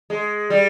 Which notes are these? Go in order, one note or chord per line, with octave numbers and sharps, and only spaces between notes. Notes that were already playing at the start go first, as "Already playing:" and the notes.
G#3
G3